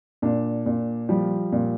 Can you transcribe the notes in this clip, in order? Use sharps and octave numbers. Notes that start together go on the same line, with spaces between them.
A#2 D4
A#2
F3 G3
A#2